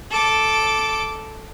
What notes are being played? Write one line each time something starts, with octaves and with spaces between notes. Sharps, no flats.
A4 D6